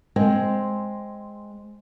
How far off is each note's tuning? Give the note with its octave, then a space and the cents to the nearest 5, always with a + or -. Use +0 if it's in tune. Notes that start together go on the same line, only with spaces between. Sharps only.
G#3 +0 C4 +0